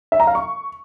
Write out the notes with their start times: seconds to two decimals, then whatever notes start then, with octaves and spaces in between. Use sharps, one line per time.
0.12 E5
0.20 A#5
0.27 F5
0.35 C#6